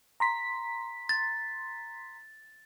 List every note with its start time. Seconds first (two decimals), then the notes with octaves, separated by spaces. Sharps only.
0.20 A#5 C6 B6
1.09 A6